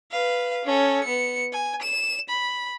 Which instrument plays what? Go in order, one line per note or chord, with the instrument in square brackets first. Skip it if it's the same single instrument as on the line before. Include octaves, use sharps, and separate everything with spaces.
[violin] B4 F5
C#4 A4
B3 C#7
G#5
E7
B5